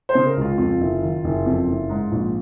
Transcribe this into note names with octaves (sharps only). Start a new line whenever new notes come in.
C5
C#3
A#4
C#2 F4
F2 F4
F#1
D#3
F#1
F2
F#1
G#2
A#1